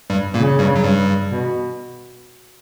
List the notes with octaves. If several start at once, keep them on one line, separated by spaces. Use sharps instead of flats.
G2 G3
A#2 C#3 A#3
G2 G3
F#3
G2 G3
B2